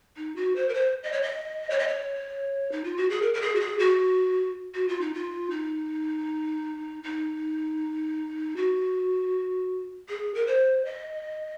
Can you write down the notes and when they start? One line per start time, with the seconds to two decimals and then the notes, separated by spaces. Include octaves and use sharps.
0.17 D#4
0.36 F#4
0.56 C5
0.69 A#4
0.74 C5
1.03 D#5
1.12 C#5
1.22 D#5
1.70 C#5
1.79 D#5
1.88 C#5
2.72 D#4
2.84 F4
2.97 F#4
3.10 G#4
3.22 A#4
3.34 A#4
3.42 G#4
3.55 F#4
3.60 G#4
3.79 F#4
4.74 F#4
4.88 F4
5.01 D#4
5.14 F4
5.50 D#4
7.04 D#4
8.57 F#4
10.09 G#4
10.35 A#4
10.47 C5
10.85 D#5